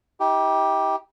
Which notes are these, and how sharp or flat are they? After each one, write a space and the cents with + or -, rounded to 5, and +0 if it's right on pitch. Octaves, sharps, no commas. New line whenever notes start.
D#4 +45 G4 +0